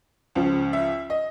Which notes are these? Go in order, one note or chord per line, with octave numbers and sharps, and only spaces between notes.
C#2 C#3 F3
E5
D#5